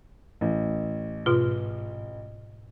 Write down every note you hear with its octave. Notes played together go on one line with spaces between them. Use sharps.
A1
G#2 B2 F4